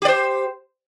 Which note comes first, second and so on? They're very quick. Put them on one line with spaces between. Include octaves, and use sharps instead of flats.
G4 D5 C5